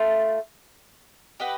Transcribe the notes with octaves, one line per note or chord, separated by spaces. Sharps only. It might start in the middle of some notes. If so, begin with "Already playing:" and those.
Already playing: A3 F4
G4 B4 D#5 F#5